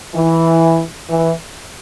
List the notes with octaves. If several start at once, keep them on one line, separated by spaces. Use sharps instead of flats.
E3
E3